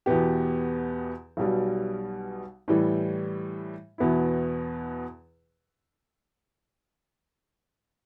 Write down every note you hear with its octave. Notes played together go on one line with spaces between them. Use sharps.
E2 B2 B3 G4
B1 B2 G3
A2 E3 G3
E2 B2 B3 E4